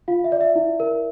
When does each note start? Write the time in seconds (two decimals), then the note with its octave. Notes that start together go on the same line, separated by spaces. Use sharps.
0.08 F4 F5
0.24 E5
0.32 D5
0.41 E5
0.56 E4
0.80 A#4